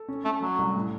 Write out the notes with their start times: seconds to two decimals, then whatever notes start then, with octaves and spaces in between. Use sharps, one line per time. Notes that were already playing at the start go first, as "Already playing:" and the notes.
Already playing: A4
0.08 C#4
0.25 A3 C#4
0.42 F#3 A3
0.58 C2
0.75 A2